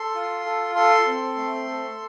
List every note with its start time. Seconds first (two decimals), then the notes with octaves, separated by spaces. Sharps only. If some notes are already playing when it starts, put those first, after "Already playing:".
Already playing: A4 C6
0.15 F4
0.46 A4
0.75 A4 C6
1.06 C4
1.37 A3
1.68 A4